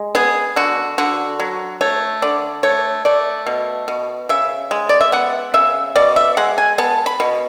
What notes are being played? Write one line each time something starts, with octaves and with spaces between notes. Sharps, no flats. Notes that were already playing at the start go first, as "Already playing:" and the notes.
Already playing: G#3
B3 G#4
D3 F#4
D3 F#4
F#3
A3 C#5
D3 D5
A3 C#5
A3 D5
B2
B2
C#3 E5
G#3
D5
E5
B3 F#5
C#3 E5
B2 D5
E5
G#3 F#5
G#5
B3 A5
B5
B2